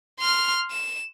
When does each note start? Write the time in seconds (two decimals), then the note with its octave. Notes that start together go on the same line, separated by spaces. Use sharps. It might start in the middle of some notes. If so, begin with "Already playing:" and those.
0.20 C6 F6
0.71 E7